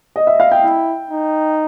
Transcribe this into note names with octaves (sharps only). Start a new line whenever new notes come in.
D#5
E5
F5
G5
E4
D#4